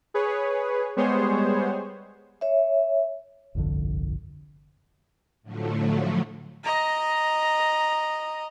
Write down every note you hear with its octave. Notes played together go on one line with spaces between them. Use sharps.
G#4 B4 C#5
G3 G#3 B3 G#4 C5 C#5
C#5 E5
G1 C2 F2 D3
A2 D3 F3 F#3 A3
D#5 A#5